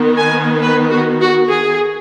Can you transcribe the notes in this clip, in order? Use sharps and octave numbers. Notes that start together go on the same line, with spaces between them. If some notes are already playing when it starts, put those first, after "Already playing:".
Already playing: D#3 B3
G#5
B4
F#4
F#4
G#4